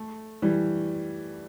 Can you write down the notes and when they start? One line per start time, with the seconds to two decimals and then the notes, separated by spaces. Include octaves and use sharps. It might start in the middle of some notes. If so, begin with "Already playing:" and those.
Already playing: A3
0.42 E3 G3